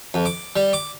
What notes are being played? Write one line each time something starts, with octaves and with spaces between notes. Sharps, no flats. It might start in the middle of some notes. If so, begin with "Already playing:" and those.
F2
D6
G3
D6